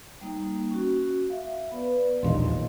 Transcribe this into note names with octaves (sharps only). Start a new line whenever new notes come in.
G3 A#3 D#4
C#4 F#4
E5 F5
B3 B4 D5
E1 A#1 D#2 D#5 F5 C6